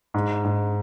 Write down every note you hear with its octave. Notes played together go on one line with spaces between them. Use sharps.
G#2
G#2